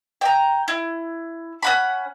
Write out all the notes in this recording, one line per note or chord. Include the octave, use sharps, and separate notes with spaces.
G5 A#5
E4
C#4 F#5 B5